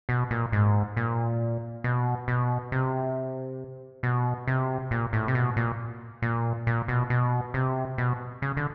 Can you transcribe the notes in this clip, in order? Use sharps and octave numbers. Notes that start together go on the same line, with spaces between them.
B2
A#2
G#2
A#2
B2
B2
C3
B2
C3
A#2
A2
C3
B2
A#2
A#2
A#2
B2
B2
C3
B2
C#3
D3